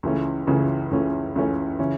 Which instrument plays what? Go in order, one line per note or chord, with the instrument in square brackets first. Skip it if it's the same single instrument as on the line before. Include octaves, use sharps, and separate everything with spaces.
[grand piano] C#2 C#3 E3 A3 C#4
C#2 C#3 E3 A3 C#4
C#2 C#3 E3 A3 C#4
C#2 C#3 E3 A3 C#4
C#3 E3 C#4 E4